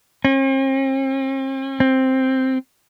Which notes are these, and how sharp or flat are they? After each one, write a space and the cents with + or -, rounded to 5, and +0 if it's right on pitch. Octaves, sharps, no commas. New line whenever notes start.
C4 +45
C4 +5